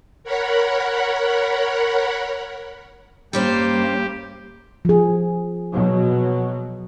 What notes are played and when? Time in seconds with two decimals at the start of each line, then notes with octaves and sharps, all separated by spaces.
0.24 A#4 C#5 F#5 B5
3.33 G2 G3 A#3 C#4 G4 C5
4.85 F3 G#4
5.72 B2 F#3